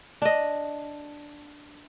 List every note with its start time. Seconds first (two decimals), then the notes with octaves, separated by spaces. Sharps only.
0.22 D4 D#5